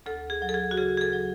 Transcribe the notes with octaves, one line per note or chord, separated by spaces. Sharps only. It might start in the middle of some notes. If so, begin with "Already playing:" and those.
D2 A4
G#4
F#3
A4
G#4
F#4
C#3 G#4
G#4
A4
F#3